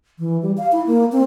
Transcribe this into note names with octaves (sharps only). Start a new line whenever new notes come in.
E3
G3
F5
E4
A#3
C4